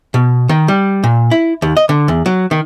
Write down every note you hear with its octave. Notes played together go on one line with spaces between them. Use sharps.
B2
D#3
G3
A#2
E4
D#2
D#5
D3
E2
F#3
D#3